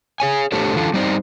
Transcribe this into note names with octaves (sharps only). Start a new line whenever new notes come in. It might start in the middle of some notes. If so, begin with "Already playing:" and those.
G#4 C#5 G#5
A3 D4 G4 A4 C5 C#5
D3 E3 F4 A4
G3 C4 D#4 C5 D5